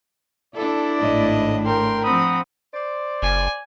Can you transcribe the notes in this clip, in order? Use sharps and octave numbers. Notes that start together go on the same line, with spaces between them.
D4 E4 A4 D5
G#1 A2 D#5
A#4 G5 C6
F3 C4 F#5 A#5 B5 D#6
C5 D5
F#1 G#5